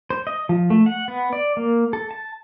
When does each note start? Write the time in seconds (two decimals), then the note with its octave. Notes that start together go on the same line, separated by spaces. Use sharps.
0.10 C5
0.27 D#5
0.49 F3
0.70 A3
0.86 F#5
1.08 B3
1.33 D5
1.57 A#3
1.93 A4
2.11 A5